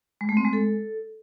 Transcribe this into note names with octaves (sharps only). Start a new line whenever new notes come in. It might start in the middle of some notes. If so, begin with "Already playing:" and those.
G#3
A3
C4
G#3
A4